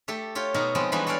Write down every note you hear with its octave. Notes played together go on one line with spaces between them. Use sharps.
A3 G4 A4
F4 G4 C#5
B2 D#4 F#4 A#4
F3 G#3 B3 C4
E3 G3 G#3 B3 D4 F#4
F#4 A4 C#5 D5 F5